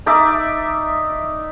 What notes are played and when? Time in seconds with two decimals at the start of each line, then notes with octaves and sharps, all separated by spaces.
0.06 D#4 D5 E5 D6